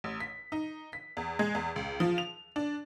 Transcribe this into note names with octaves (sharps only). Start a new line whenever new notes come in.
A1
B6
D#4
B6
E2
G#3
E2
C#2
F3
F7
D4